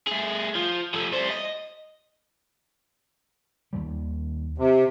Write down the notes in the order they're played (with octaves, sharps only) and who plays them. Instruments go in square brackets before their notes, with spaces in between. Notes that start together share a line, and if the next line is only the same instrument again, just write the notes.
[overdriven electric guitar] A3 G#4
F3
F3 A3
G3 C5
D#5
[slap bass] D#2 D#3 G3
[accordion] C3